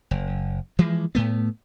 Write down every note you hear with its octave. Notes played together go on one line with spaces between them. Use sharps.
F#1
E3 F3 G#3
A2 A3 B3